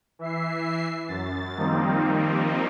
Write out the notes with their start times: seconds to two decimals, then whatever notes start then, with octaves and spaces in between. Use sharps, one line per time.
0.19 E3 E5 C7
1.08 F#2 A6
1.56 D#3 F3 G3 A#3 C4 D#4